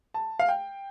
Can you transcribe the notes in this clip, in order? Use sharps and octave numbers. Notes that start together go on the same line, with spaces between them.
A5
F5
G5